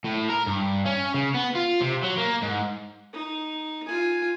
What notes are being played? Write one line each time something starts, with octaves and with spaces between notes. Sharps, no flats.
A2
A#4
G2
C#4
C#3
B3
F4
C3
F#3
A#3
G#2
D#4
F4 G#5